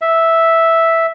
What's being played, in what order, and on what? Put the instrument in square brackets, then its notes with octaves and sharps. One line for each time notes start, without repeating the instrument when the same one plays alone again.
[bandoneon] E5